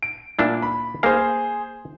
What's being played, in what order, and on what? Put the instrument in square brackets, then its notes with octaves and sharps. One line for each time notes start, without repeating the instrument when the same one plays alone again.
[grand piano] D7
[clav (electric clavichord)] A#2 D4 E4
[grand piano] B5
[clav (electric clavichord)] A#3 F5 [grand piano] G#4 C5